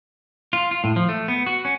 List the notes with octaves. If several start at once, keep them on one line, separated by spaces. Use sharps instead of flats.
F4
F4
A2
F3
A3
B3
F#4
C#4